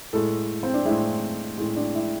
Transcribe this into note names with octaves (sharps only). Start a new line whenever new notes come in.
A2 G#3 A4
C4
D4
A2 G#3 E4
A2 G#3
D4
E4